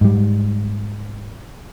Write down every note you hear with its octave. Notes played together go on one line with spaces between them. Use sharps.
G#2 G3